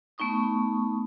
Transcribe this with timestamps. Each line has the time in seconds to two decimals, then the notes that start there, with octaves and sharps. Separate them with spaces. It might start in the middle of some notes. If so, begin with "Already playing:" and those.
0.18 A3 B3 D#4 C#6 D#6